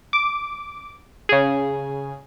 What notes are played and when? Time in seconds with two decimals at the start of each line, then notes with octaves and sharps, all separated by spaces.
0.13 D6
1.29 C#3 G#4